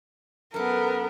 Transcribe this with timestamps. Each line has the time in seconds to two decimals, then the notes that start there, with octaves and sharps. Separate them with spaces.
0.54 F#2 B3 A4 A#4